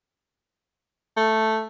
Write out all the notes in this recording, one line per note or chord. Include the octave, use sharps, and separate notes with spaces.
A3